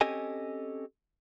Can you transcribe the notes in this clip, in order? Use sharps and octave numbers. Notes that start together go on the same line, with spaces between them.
C4 C#4 G4 A4 D#5 G#5